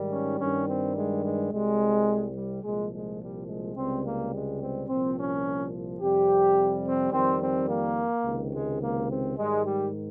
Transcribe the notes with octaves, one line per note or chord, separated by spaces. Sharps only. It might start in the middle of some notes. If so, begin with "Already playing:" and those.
Already playing: G#2 D#3 G3
C#4
G2 D#3 G3 C#4
C4
G#3
G#3
C2 C3 G3 G#3
G3
C2 A#2 F3 G#3
G#3
G3
G#3
C#2 C3 G3 C4
A#3
G#3
C4
C2 A#2 F3 C4
C#4
F2 C3 G3 G4
C4
F2 D#3 G3 C4
C4
A#3
C#2 C3 D#3
G#3
A#3
C4
G#2 D#3 G3 G#3
G3